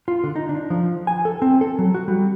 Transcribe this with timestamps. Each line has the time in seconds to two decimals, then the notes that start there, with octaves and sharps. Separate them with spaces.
0.08 F4
0.24 D3
0.36 D#4
0.49 D4
0.70 F3
1.07 G#5
1.25 A4
1.42 C4
1.61 A4
1.79 F#3
1.94 F#4
2.08 G3